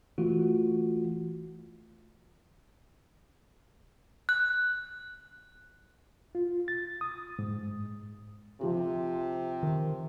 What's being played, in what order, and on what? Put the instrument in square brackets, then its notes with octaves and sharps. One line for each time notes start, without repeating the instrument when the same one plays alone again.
[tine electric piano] E3 A3 F4 F#4
[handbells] F#6
[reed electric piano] F4
A6
D#6
G#2
[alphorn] C3 [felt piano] F3 G4
[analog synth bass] D#3